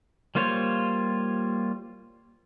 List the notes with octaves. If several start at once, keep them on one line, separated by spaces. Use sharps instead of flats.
G3 A#3 F4 C5 C#5